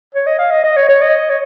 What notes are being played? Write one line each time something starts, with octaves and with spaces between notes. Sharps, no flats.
C#5
D#5
F5
D#5
D#5
C#5
C#5
D#5
C#5